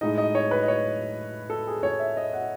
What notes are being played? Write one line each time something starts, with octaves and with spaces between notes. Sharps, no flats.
A2 G#3 D#4 D#5
D#5
C#5
B4
D#5
C#5
A4
G#4
C#5
E5
D#5
F#5